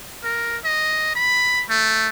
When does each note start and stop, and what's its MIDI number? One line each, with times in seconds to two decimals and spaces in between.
0.23 0.57 70
0.64 1.13 75
1.15 1.63 83
1.69 2.09 57